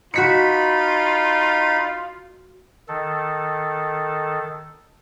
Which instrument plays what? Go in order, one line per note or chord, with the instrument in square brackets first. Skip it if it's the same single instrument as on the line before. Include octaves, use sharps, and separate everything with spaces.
[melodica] D#4 B5 [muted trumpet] F4 [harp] F#4 B6 C#7
[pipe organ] D#3 A4